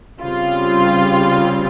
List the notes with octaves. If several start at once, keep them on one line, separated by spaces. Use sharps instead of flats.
C#3 G3 C4 F4